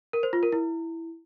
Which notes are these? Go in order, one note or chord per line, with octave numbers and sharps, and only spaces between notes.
A#4
C5
F4
A#4
E4